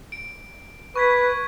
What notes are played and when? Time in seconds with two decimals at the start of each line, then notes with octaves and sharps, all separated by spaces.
0.12 D7
0.96 B4 C#6 G#6 B6